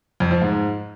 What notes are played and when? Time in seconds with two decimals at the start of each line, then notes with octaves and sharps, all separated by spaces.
0.20 F2
0.31 F3
0.42 G#2